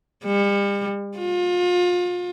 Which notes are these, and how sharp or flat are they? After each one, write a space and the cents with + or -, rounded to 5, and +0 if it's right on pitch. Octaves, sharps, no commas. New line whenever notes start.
G3 +40
F4 +35